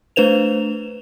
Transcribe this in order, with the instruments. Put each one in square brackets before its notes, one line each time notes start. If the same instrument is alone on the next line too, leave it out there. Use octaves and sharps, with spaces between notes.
[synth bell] A3 D4 B4 C5 E7 F7